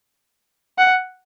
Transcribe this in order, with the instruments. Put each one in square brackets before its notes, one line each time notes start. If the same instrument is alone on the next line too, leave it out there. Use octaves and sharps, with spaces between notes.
[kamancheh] F#5